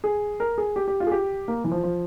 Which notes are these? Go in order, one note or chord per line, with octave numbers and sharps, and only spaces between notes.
G#4
A#4
G#4
G4
G4
F4
G#4
G4
A#3
E3
F3
F3